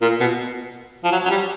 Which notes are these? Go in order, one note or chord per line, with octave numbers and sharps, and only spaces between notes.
A#2
B2
F3
F#3
F#3
G3